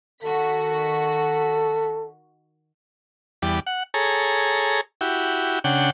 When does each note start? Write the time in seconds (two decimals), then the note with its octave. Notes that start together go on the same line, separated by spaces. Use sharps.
0.22 D#3 F#4 A4 B6
3.42 E2 G3 D6
3.67 F#5
3.94 G#4 A4 C#5 A#5
5.01 E4 F#4 G4
5.64 C#3 D4 F#5 G5